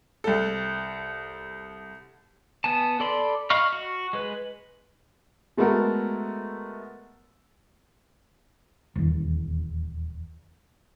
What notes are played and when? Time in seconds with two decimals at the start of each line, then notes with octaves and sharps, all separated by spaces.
0.24 C2 A4
2.64 B3 G#5 A5
3.00 A4 D5 B5 C6
3.50 D#5 F5 B5 C#6 F6
3.73 F#4
4.13 G#3 B4
5.57 G#3 A3 B3 F#4 A4 A#4
8.95 D#1 E2